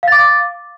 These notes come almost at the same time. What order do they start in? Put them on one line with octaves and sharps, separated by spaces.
F5 A6 D6